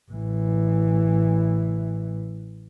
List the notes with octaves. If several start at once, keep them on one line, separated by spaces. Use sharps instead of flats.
A1 E3